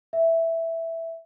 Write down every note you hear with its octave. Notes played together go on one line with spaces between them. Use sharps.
E5